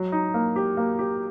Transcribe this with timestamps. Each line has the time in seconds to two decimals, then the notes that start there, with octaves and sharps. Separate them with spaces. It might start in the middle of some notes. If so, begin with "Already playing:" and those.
Already playing: F#3
0.12 D#4
0.34 A#3
0.56 G4
0.77 A#3
0.99 G4